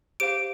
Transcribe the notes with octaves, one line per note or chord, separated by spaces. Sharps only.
G4 C5 F5 D7